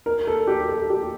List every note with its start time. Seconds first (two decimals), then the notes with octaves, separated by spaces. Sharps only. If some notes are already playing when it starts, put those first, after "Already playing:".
0.06 A#4
0.27 A4
0.47 G4
0.69 A4
0.90 G4